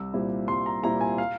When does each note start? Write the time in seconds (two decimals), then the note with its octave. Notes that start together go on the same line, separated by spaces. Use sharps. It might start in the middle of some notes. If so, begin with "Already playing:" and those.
Already playing: C2 E6
0.14 A#2 G3 C4 E4
0.48 C2 C6
0.66 A#5
0.83 A#2 G3 C4 E4 A#5
1.01 G#5
1.18 F5